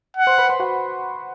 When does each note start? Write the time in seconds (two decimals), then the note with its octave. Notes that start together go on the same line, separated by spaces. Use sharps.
0.17 F#5
0.27 C5 C6
0.38 B4 B5
0.49 C5 C6
0.60 F#4 F#5